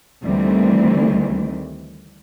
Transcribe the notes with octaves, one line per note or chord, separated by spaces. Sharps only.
D2 D#3 E3 G3 C4